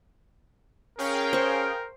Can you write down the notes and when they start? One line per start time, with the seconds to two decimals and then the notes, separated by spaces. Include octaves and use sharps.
0.99 C#4 G#4 A#4 F5 G5
1.33 C5 C#6